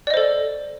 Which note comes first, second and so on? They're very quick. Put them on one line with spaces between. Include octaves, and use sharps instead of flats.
D5 D#5 C5 A4